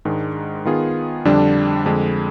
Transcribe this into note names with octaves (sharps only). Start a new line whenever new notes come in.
G#2 D#3 G#3 D4
D#3 B3 F4 G#4
F2 D3 G3 D4
F2 D3 G#3